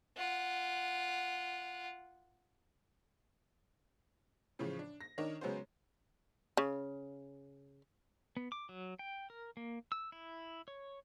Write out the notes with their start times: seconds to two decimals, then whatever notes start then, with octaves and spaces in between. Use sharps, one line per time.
0.17 F4 F#5
4.59 A2 C#3 E3 F3
4.79 D4
5.01 A#6
5.18 D#3 D4 A#4 C#5 D#5
5.41 C#3 F#3 G#3 B3 C#4 C5
6.57 C#3
8.37 B3
8.52 D6
8.69 F#3
8.99 G5
9.30 A#4
9.57 A#3
9.92 E6
10.12 E4
10.68 C#5